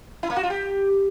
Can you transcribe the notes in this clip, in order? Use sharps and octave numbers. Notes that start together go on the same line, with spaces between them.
E4
A#3
F#4
F4
G4